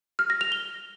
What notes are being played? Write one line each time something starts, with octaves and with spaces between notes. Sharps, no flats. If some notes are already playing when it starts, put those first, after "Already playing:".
F6
A#6
F7
G7